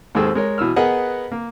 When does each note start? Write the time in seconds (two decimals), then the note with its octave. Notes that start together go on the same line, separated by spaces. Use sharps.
0.15 D#2 G#2 C4 G#4 A4 E6
0.35 G#3 A#4 C#5
0.58 B2 E3 E6 F6
0.76 B3 G#4 A#4 B4 D#5 F#5
1.32 A#3